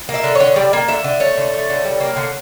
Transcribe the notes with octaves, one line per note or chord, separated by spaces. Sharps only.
A#3
E5
D3
D3 C#5
G3 D5
A#3
D3 E5
D3
A3 C#5
D3
A3
D3
G3
A#3
D3